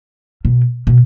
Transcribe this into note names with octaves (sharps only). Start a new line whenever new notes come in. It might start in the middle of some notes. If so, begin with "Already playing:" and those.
B2
B2